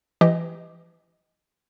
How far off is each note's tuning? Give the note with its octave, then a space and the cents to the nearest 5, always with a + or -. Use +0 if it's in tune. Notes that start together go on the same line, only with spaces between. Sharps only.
E3 +30 G4 +0 D#5 +0